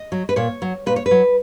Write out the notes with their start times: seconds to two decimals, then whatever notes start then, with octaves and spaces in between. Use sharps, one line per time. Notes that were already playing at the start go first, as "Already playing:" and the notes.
Already playing: D#5
0.12 F#3
0.29 B4
0.36 A#2 C#5
0.62 F#3
0.86 A#2 B4
0.96 C#5
1.06 B4
1.11 F#3